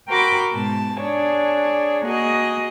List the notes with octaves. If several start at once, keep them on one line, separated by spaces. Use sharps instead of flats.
F#4 A#4 G5 B5 C6 D6
G#2 B2 A5
D4 G#4 C#5
A#3 F#4 G#4 D#5